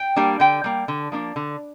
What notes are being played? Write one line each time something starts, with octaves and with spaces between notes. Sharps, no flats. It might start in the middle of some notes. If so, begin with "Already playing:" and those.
Already playing: G5
G3 A#3 D4
D3 G5
G3 A#3
D3
F3 A#3 D4
D3